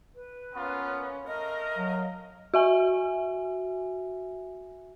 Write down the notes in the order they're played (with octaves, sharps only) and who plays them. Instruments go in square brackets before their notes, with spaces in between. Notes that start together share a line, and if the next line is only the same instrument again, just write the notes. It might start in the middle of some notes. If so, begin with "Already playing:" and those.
[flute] B4
[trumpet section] A#3 B3 F4 [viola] C#4
[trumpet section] A3 F5 [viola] A#4 [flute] D#5
[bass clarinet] F#3
[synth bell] F#4 E5 G#5